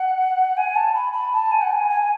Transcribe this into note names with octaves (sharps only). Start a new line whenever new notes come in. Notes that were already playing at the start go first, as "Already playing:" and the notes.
Already playing: F#5
G#5
A5
B5
B5
A5
G#5
F#5
G#5
G#5
G#5